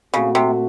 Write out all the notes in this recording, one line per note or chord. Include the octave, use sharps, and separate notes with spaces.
A#2 C#3 A3 C4 F#4
C3